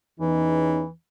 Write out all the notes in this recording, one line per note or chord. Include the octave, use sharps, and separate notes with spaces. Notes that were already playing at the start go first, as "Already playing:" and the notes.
E2 E3 C#4 D#4